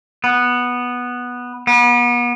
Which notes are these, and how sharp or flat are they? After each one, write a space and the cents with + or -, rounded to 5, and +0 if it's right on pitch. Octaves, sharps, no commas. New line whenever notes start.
B3 -5
B3 -35